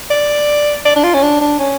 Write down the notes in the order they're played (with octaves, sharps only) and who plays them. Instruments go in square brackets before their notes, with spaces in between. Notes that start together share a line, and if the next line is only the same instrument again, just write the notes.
[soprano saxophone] D5
D5
D4
F4
C#4
D4
D4
C#4